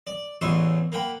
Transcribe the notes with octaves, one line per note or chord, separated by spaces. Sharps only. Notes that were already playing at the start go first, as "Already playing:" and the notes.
D5
A1 E2 E3 C6 C#6 D#6
A#3 F#5 G5 B5